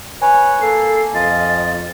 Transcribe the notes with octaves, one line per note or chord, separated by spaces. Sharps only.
B4 C#5 G#5
A#3 A4 C7
F2 F4 D#5 A6